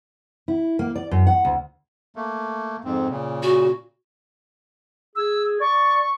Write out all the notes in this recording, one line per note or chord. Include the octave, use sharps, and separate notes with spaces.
E4
A#3
D5
F#2
F#5
D2
A3 A#3
F2 G#2 C4
A#2 C#3
F#4
G#4 E6
D5 C#6